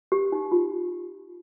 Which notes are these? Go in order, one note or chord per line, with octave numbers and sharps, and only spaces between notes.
G4
D#4
F4